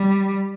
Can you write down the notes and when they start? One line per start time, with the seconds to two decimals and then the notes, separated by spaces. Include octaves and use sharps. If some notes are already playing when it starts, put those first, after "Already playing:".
Already playing: G3